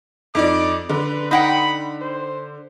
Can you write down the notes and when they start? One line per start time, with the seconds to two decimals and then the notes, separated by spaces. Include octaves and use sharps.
0.35 F2 D#4 D5 D6
0.89 D3 B4
1.31 D#4 F#5 G5 B5
2.02 C5